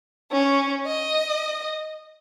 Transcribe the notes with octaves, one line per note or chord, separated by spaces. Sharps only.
C#4
D#5